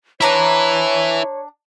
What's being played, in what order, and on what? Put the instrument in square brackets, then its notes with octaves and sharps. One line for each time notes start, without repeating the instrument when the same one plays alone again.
[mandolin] D4 A#5 D6 [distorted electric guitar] E4 B4 [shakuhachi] C#5